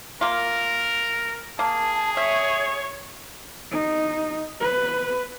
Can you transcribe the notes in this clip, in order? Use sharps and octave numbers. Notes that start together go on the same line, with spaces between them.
A#3 F4 A#4
A#3 G#4 A5
C#5 E5
D#4
B4